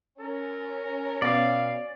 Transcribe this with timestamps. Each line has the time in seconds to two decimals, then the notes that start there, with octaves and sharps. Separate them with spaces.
0.20 C#4 A#4
1.22 B2 D5 F5